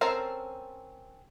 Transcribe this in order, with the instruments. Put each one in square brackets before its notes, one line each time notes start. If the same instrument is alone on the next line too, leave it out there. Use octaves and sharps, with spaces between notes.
[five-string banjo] C4 C#4 A4 A#4 C5